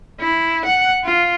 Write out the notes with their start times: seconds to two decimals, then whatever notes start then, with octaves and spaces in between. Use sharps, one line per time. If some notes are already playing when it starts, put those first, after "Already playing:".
0.21 E4
0.65 F#5
1.04 F4